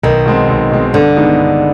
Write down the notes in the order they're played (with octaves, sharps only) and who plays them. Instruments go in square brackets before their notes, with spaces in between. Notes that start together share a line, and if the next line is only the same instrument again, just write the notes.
[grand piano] B1 [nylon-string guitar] D#3
[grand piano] B2 G#3 C4
B1
B2 G#3 C4
[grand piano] G2 [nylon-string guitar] D3
[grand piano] D#3 G#3 B3 D#4
G2